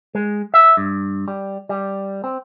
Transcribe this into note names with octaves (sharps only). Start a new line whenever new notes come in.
G#3
E5
G2
G3
G3
C4